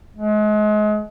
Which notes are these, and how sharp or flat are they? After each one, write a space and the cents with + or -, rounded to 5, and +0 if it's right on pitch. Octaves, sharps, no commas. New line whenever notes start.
G#3 +35